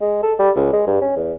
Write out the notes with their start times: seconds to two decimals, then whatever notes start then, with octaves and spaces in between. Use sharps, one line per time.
0.01 G#3
0.23 A4
0.39 G3
0.56 C#2
0.73 G#3
0.87 G2
1.01 C#4
1.16 E2